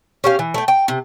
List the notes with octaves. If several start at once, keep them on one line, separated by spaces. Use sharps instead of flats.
C#4 G4 F5
E3
A3 G5
G5
C3